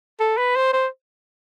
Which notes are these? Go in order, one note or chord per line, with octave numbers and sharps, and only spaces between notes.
A4
B4
C5
C5